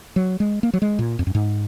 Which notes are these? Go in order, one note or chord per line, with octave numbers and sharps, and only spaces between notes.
F#3
G#3
A#3
F#3
G#3
A#2
F2
F#2
G#2